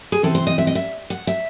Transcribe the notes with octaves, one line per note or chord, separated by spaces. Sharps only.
G#4
C3 E3 C4 A4
C5
D#5
E5
D#5
E5
F#5
E5